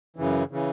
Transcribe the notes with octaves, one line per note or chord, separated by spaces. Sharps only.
F#2 C#3 E3
C#3 E3